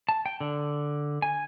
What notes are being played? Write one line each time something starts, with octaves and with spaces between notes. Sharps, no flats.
A5
G5
D3
G#5